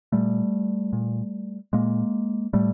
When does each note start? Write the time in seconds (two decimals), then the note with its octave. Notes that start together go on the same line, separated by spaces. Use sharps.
0.12 A#2 G3 A3
0.93 A#2
1.73 A#2 G#3 A#3
2.53 A2 G3 A3